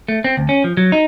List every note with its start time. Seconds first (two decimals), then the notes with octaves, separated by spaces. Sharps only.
0.08 A3
0.24 C4
0.37 D2
0.49 C#4
0.64 F3
0.77 F#3
0.92 D#4